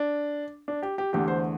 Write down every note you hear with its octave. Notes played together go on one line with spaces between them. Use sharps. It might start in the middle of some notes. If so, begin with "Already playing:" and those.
Already playing: D4
D4
G4
G4
E2 D3 A3 G4
C5